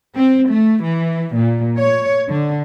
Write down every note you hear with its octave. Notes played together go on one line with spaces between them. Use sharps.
C4
A3
E3
A#2
C#5
D3